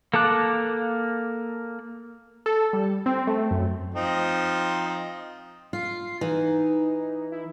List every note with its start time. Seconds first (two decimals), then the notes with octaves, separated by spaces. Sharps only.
0.14 A#3 A4 A5 D6 F#6
2.46 A4
2.73 G3
3.06 C4
3.27 A3
3.51 F#2
3.95 F3 C4 D#4
5.73 F4 C7
6.21 E3 D#4
7.32 E4